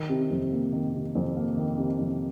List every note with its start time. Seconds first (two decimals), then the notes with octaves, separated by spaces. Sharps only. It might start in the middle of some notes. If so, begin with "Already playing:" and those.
Already playing: D#3
0.09 C3
0.30 F2
0.51 A#3
0.72 D#3
0.94 C3
1.15 F2
1.36 A#3
1.57 D#3
1.78 C3
1.99 F2